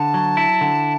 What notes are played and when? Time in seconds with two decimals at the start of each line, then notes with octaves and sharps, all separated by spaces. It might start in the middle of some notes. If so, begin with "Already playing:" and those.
Already playing: D3 A5
0.14 F#3
0.37 E4
0.61 D3